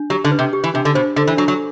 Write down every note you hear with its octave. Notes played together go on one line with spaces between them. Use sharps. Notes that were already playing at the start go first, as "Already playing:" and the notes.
Already playing: D4
F#3 G4
D3
B4
C3
G4
E3
C3 D4
D3
B2 C5
D3 A4
E3
F#3 D4
F#3